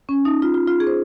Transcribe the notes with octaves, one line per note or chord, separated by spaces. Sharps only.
C#4
D#4
F4
F4
F4
G#4
C5